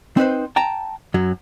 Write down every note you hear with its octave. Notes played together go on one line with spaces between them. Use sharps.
C4 D#4 B4 C5
G5 A5 A#5
F#2 F#3